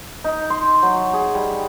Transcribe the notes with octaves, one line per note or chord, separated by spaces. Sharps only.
D#4
C6
F#3
G#4
G3